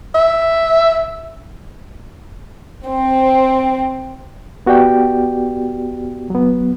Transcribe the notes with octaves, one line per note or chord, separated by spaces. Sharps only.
E5
C4
B3 F#4 G4 D5 G5
F#3 B3